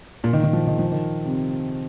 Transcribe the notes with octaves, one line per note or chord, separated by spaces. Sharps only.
A#2
D#3
D#3
F3
D#3
F3
D#3
C3